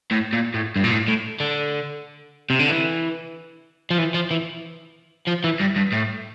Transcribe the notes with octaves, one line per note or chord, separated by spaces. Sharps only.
A2
A#2
A2
G2
A#2
A2
A2
D3
C3
D3
E3
F3
E3
F3
E3
F3
E3
G2
G2
A2